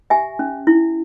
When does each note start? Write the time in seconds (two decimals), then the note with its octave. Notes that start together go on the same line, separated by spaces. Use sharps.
0.10 G4 E5 G#5
0.39 C#4
0.67 E4